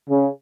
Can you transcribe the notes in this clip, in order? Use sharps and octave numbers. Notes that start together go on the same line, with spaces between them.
C#3